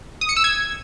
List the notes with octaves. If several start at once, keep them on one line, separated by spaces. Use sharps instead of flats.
D#6
C#7
E6
G#6